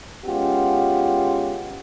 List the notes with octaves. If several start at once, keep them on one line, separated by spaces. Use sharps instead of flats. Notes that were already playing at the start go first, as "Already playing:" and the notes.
G#3 B3 C#4 F4 G4 F#5